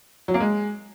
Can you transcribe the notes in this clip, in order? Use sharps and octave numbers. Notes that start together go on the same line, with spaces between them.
F#3
A#3
G#3